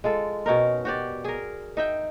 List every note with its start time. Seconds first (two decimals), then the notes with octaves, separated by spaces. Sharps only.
0.04 G#3 F4 A4
0.46 B2 C#4 D#4 A#4
0.85 F#4 G4 D5
1.24 G#4 A#4
1.77 D#4 E5 G5